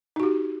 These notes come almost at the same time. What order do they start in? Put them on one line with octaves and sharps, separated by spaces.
D#4 F#4 G4